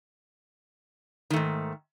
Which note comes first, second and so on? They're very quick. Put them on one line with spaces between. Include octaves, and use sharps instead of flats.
D#3 A3 G#2